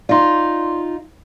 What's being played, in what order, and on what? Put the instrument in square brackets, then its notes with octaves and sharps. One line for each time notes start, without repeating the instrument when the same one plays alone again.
[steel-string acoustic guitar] D#4 F4 [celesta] D5 C6